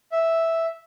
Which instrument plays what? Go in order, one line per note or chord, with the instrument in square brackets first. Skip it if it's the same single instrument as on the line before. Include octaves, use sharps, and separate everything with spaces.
[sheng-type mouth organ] E5